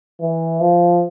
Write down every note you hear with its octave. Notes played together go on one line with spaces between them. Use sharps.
E3
F3